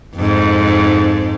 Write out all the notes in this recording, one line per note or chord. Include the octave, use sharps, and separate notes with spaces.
F2 G#2